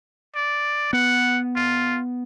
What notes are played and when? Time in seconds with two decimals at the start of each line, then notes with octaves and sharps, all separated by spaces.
0.35 D5
0.93 B3 F#5
1.56 F4